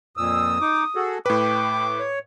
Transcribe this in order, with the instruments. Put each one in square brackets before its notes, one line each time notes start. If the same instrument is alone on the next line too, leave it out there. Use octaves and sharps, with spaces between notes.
[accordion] F2 A#2 E6 [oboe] D#6
[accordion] D#4 D6
F#4 G#4 A4
[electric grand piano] A2 B4 [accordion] G5 [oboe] D6
[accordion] C#5